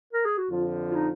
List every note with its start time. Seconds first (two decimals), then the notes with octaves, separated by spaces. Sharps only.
0.13 A#4
0.25 G#4
0.38 F#4
0.50 F2 D3 F3 F4
0.91 F4
0.95 D#4